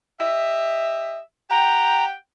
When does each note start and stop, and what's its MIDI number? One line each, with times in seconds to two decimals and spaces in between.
0.20 1.19 67
0.20 1.19 75
0.20 1.19 76
1.50 2.13 67
1.50 2.13 78
1.50 2.13 79
1.50 2.04 82